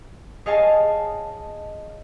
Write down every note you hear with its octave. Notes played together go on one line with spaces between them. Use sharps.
G#4 C#5 D#5 F5 G#5 A5